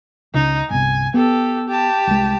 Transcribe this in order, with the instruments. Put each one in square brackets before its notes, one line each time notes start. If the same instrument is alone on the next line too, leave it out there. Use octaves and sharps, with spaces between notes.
[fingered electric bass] C#2 C#3 [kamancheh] D#4
[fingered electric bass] G1 C2 [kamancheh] G#5
[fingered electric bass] B3 [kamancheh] G4 A4
[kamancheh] G4 A5
[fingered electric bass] C2 G#3